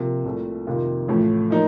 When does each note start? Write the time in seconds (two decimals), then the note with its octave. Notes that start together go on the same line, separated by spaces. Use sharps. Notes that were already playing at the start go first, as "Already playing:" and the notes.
Already playing: C3 F3 A#3
0.25 C2 A#2 A3
0.67 F2 C3 D#3 A#3 F4
1.08 A1 A2 F3 A3
1.50 A#2 F3 A#3 D#4 A#4